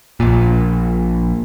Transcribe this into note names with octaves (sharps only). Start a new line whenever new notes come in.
A#1 A#2